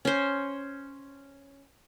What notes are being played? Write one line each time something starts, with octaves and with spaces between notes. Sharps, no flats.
C#4 C5